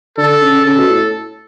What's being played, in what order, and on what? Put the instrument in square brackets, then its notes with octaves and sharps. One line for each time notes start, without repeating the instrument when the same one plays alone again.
[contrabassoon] D3 [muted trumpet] A4
[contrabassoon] C#3
[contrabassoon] C#3 [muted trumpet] A4
[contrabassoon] B2
A2